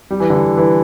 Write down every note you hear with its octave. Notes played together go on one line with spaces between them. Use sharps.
G3
E3
D3
E3